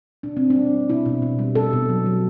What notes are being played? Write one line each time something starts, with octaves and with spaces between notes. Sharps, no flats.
B2 D4
B2 C4
D4
G3
G3
B2 E4
B2
B2
G3
B2 A4
B2
F#3
F#3